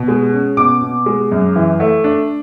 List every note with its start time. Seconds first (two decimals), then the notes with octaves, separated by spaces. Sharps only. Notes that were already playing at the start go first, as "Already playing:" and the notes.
Already playing: B2
0.08 G#3
0.32 C#4
0.57 B2 D6
0.82 B2
1.06 G#3
1.31 F#2
1.56 E3
1.80 A3
2.04 D4